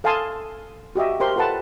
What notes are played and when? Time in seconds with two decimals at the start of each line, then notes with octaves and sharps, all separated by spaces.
0.04 A4 F5 G#5 A5 C6 D#6
0.95 F#4 G4 D#5 E5
1.20 G4 A#4 C5 C6
1.36 F4 A4 B4 F#5 A5